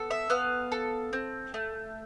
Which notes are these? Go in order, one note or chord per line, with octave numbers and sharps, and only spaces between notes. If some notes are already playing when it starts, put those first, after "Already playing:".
Already playing: B3 A4
E5
B3 F5
A4
C4
A3